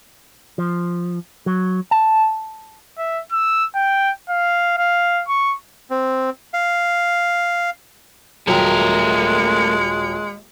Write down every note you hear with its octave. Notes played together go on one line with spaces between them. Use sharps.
F3
F#3
A5
E5
E6
G5
F5
F5
C#6
C4
F5
D#1 F#3 G#3 A3 A#4 G5